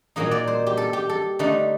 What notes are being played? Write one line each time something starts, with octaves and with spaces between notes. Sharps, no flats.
A#2 F#3 A#3 D#4 D#5
D5
C5
G4
A4
G4
A4
D3 A3 D#4